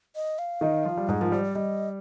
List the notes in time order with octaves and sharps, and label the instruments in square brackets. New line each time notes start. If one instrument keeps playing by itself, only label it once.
[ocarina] D#5
F5
[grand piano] D#3 D#4
F3 F4
G3
[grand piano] G#2 G#3 [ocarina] G#4
[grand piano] F3 [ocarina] A#4
[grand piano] G3 [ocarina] C5
[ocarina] D5
[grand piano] G3 [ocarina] D#5